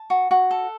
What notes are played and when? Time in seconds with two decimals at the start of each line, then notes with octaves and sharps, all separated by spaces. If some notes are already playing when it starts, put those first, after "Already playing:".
Already playing: A5
0.10 F#4
0.31 F#4
0.51 A4